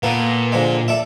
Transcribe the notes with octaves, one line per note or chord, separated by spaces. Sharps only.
A#2 A#3 B3 A4
D3 F3 G#3
A4 D5 E5